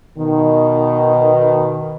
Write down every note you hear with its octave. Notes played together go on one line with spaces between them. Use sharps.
B2 D#3